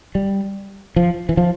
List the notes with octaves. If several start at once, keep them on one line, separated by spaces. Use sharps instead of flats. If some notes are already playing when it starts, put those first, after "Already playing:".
G3
F3
E3
F3